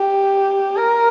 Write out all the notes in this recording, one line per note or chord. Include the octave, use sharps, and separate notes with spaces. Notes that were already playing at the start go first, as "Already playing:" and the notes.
Already playing: G4
A#4